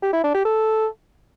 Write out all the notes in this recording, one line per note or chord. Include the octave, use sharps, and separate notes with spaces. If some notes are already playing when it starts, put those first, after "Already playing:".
G4
E4
D4
G4
A4